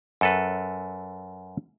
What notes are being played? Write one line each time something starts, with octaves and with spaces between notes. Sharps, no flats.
F#2 A4 B4